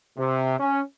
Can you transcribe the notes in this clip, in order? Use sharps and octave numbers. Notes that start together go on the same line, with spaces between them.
C3
C#4